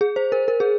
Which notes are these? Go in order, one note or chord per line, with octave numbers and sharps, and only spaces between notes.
G#4
C5
A#4
A#4
G#4